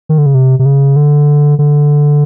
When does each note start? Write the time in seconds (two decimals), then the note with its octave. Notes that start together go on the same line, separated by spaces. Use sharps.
0.09 D#3
0.18 D3
0.26 C#3
0.34 C3
0.59 C3
0.66 C#3
0.96 D3
1.59 D3